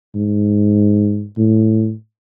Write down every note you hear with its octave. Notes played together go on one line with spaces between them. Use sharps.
G#2
A2